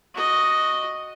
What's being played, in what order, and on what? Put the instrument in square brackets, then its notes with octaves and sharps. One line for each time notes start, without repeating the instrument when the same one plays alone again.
[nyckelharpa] F#4 D#5